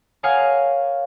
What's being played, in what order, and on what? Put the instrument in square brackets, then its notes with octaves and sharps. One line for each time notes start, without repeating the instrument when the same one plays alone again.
[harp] A#4 C#5 F5 F#5 G#5 D#6